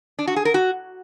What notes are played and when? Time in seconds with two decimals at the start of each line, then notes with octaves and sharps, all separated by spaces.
0.19 D4
0.27 F#4
0.36 G#4
0.45 A#4
0.54 F#4